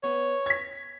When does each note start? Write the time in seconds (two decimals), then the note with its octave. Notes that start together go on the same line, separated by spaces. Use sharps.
0.03 B3 C#5
0.46 G#6 B6